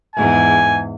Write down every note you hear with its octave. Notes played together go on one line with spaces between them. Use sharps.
E2 G#2 G#5